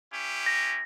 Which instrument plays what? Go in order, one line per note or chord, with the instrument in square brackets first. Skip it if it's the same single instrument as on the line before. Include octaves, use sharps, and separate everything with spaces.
[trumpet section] C#4 E4 G4
[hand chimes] A#6